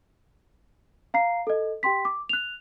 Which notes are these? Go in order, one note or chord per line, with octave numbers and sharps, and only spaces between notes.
F5 A#5 C7
A4 D#5
G4 G5 C6 B6
D6
F#6 F7